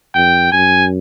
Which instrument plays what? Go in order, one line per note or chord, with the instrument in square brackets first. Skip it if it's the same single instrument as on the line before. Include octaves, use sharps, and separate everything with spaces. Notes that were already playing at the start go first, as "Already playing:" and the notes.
[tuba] F2 [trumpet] G5
[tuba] F#2 [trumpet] G#5